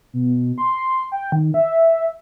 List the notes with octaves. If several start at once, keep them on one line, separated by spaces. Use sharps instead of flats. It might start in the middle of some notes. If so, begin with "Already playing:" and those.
B2
C6
G5
D#3
E5